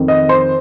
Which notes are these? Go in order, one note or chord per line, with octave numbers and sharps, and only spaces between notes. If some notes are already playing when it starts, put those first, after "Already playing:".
Already playing: F2 D#3 C4
D#5
C5